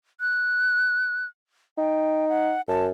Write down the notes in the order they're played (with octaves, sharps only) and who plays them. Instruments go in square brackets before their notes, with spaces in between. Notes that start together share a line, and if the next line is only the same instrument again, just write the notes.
[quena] F#6
[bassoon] D#4 [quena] G5
[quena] F#5
[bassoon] F#2 [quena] A5